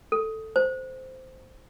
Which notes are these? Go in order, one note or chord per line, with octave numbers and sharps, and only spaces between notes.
A4
C5